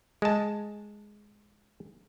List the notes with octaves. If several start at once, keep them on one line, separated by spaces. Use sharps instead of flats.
G#3 A5